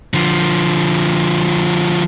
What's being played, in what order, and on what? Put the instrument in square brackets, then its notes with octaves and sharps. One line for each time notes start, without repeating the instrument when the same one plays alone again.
[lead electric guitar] D3 F3